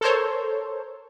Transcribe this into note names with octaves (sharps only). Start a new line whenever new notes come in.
A4 A#4 C5 C#5